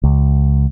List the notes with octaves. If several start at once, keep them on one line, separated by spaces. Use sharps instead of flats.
C#2